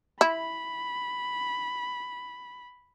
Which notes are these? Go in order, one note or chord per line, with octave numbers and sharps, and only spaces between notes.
E4 B5